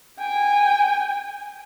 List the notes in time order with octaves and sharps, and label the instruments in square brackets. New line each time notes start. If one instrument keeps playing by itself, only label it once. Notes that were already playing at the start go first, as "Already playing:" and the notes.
[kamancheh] G5 G#5